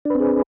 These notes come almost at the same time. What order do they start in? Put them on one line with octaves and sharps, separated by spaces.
D4 B4 C4 G#4